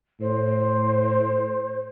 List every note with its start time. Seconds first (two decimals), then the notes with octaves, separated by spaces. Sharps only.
0.21 A2 C5